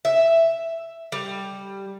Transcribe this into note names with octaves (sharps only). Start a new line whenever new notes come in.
E5
G3